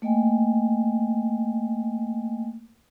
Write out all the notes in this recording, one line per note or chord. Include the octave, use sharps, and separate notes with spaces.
A3 A#3 D#5 G5 G#5